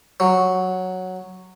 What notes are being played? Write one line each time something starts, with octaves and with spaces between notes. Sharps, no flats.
F#3